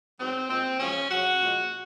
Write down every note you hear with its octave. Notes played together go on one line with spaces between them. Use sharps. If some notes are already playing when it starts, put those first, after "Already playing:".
G#2 F#3 C4
A#2 G#3 C4
F#2 C#3 F3 G#3 C#4
F#2 C#3 F#3 F#4
A#2 F3 G#3